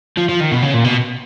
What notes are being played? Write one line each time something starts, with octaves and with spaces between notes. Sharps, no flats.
F3
F3
D#3
B2
C#3
A#2
B2